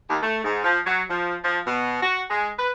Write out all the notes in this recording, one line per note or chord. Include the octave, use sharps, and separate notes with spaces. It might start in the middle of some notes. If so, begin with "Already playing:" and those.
D#2
A3
G#2
F3
F#3
F3
F3
B2
F#4
G#3
B4